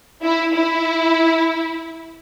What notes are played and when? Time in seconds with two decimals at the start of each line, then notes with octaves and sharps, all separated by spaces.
0.23 E4
0.55 E4